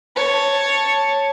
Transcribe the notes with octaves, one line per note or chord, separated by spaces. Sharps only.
C#5 A5